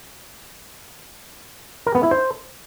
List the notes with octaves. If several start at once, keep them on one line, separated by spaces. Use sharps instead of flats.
A#4
B3
E4
C5